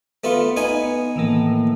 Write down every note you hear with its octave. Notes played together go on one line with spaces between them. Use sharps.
A3 B3 F4
B3 D#4 G#5
A2 D#3 E3 A#3